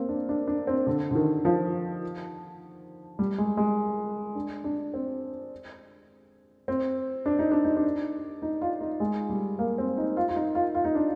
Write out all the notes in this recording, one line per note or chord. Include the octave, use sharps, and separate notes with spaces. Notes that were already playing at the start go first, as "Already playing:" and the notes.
Already playing: A#3 C4
D4
D4
D4
C4
D3
D3
D#3
F3
G3
G#3
G#3
D4
D4
C4
C4
D4
D#4
D4
D#4
D4
D#4
F4
D#4
G#3
G3
A#3
C4
D#4
F4
F4
D#4
F4
F4
D#4
D4